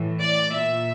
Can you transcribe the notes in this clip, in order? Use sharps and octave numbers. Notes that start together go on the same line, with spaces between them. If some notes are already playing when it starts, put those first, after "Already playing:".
Already playing: A2 E3
D5
A#2 E5